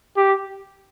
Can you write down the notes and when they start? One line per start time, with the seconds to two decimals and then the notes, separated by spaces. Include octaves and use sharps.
0.17 G4